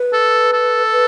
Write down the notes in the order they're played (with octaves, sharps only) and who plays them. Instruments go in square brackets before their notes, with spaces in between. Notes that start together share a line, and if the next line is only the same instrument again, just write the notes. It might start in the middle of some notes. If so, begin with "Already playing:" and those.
Already playing: [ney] B4
[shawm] A4
A4
[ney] B4